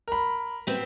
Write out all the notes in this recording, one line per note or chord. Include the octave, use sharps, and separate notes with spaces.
A#4 B5
B3 C4